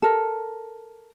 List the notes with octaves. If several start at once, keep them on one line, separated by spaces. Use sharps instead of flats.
A4 A#4